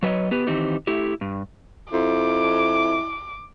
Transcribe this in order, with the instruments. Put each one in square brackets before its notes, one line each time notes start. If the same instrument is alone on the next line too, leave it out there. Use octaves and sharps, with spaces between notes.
[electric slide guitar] F#3 B4 C#5 D#5
B3 G4 B4
D#3 E3 C4 D#4 G4
A3 E4 G4
G2
[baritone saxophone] F2 [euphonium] E4 [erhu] D6